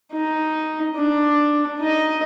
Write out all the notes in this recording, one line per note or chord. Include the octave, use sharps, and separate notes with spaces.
D#4
D4
D#4 D#5